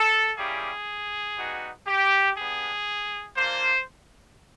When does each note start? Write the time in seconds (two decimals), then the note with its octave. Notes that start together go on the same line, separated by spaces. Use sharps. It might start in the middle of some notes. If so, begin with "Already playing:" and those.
Already playing: A4
0.37 G3 A#3 C#4 E4 G4 G#4
1.37 G3 B3 D#4 F#4
1.87 G4
2.37 B3 D4 G4 G#4
3.37 A#3 D4 F4 C5